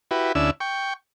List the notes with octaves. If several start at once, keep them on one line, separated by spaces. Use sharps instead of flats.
E4 F#4 G4 B4
D2 C#4 D4 E4 E6
G5 C#6